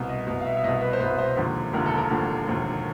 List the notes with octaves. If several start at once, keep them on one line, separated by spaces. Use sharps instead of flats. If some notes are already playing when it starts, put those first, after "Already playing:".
Already playing: C2 B2
D#5
C2 B2
F5
E5
E5
C2 B2 D#5
B4
C5
C2 B2 B4
C5
E1 D#2 D3 F3
E1 D#2 D3 F3 A#4
A4
A#4
E1 D#2 D3 F3
E1 D#2 D3 F3